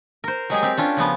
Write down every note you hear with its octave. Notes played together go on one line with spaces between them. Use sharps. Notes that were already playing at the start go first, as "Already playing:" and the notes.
A#4 C5
F#3 G#3 G4 G#4
C4 G4
C#4 D4 F4 G4
C#3 F3 B3